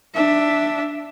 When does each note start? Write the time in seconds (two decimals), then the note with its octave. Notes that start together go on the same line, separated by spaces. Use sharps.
0.15 D4 E5